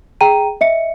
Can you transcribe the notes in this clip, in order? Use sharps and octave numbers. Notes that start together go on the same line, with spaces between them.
G#4 G5 A#5 D#7
D#5 E5 C#7